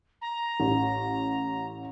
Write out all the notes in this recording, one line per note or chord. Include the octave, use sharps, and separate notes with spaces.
A#5
A1